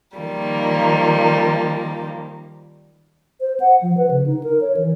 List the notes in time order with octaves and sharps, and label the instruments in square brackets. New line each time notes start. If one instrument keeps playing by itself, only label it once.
[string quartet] D#3 F3 G3 A#3
[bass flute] C5
F#5
F3
B4
C#3
D#4
A#4
C#5
E3